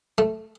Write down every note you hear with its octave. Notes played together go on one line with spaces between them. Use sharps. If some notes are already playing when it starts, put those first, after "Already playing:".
A3